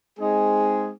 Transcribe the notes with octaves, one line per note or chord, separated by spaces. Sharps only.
G#3 C4 D#4 G#4